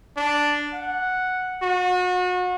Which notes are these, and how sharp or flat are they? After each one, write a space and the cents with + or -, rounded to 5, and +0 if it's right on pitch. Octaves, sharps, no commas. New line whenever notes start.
D4 +0
F#5 -5
F#4 -35